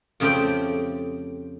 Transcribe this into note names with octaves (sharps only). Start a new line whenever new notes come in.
F2 C#3 A3 C4 G4 G5